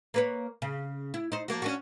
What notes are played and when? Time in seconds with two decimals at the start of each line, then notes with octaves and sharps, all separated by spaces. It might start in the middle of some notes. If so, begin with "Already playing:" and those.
0.14 A#3 B4 C#5
0.62 C#3
1.14 E4
1.32 D#4 C5
1.48 F3 A#3 F#4
1.62 C#4 D4 F#4